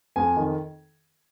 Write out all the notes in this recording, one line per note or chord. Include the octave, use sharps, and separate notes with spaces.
F2 G#5
D#3